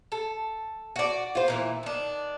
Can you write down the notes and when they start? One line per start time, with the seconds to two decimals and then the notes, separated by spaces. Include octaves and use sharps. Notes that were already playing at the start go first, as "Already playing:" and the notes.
0.12 A4
0.96 F#4 D5
1.35 F4 C5
1.48 A#2 D#3 E3
1.83 D#3 D4